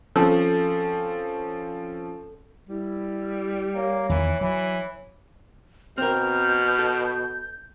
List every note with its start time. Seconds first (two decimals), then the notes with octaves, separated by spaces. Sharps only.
0.16 F3 C4 C#4 A4
2.69 G3 E4
3.75 A#3 C#5
4.09 E2 D#3 E3
4.41 E3 F#3
5.98 B2 C4 A#4 F6 G6
6.79 A4